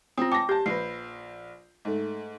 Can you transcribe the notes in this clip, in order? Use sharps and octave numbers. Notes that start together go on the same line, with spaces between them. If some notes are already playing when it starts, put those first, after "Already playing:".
C4 F4 D#6
G5 A5 D6 A#6
G4 A5 G6
A#1 B4 C7
G#2 A3